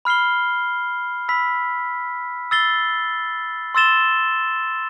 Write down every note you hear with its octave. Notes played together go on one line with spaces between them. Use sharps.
B5 F6 C7 G7
B5 E6 B6
E6 A6 C7 G7
C6 E6 A6 E7 G7